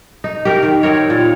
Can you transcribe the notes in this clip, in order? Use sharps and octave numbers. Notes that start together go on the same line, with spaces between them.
D#4
G4 A#4
D#3
C4 A#4 C#5
A#2